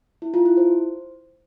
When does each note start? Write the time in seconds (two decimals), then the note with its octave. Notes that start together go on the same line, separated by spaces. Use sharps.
0.22 E4
0.34 F4
0.45 E4
0.57 C5